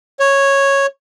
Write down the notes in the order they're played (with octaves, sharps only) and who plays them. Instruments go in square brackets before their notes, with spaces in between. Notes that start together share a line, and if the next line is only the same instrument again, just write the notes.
[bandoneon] C#5